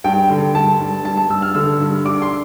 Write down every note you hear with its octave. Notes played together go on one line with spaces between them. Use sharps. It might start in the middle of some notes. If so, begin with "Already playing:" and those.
G2 G5
D3
G2 A5
G2
G2 A5
A5
G2 E6
F6
D3 E6
G2
D4 D6
C6